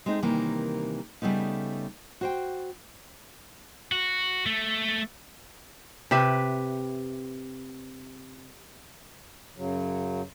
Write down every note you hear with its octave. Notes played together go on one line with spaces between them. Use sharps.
G#3 A3 C4 D#4
C3 D#3 E3 G3 A#3
C#3 G3 A3 B3 D#4
F#4 C5 G5
F#4
A3
C3 G4 B4 E5
F#2 C#3 F#3